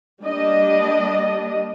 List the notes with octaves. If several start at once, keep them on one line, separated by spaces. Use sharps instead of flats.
G3 A#3 D4 D#5